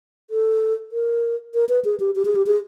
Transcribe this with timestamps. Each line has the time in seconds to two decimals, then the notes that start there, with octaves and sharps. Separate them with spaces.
0.30 A4
0.92 A#4
1.54 A#4
1.69 B4
1.85 G#4
2.00 G4
2.16 G4
2.25 G#4
2.35 G4
2.47 G#4